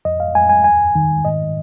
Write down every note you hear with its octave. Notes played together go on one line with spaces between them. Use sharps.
F2 D#5
F5
F2 G#5
G#5
D#2 G#5
D#3
G#2 D#5